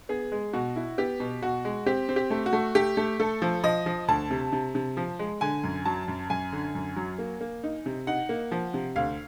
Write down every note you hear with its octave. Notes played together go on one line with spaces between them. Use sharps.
B3 G#4
G#3
B2 F#4
E4
B3 G4
B2
B2 F#4
G#3
C4 G4
C4
G4
A3
F#4
A3
A3 G4
A3
A3 A4
F3
F3 D#5
F3
D2 A5
C3
C3
C3
F3
G#3
D3 G#5
F#2
F#3 A5
F#2
F#2 G#5
D3
F#2
F#3
A#3
A#3
D#4
C3
D#4 F#5
A#3
F3
C3
D2 F5